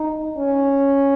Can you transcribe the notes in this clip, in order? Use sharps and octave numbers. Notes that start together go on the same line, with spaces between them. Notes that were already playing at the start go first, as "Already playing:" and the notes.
Already playing: D#4
C#4